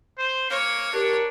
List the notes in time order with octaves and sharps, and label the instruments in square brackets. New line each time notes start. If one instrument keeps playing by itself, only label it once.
[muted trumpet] C5
[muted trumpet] A#3 [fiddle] C#5
[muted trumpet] D4 [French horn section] G4 A#4